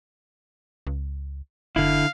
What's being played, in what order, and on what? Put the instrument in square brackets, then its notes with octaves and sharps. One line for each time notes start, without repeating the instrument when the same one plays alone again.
[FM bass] C#2
[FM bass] F#1 [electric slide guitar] D3 E4 [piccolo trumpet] F5